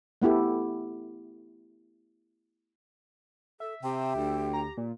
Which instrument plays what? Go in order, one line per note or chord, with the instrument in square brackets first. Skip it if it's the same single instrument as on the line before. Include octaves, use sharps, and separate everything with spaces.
[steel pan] A3 B3 E4 G4 A4
[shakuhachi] A4 [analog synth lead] E5
[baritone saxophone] C3 [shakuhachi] G4 [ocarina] G5
[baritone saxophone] D2
[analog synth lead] A#5
A#2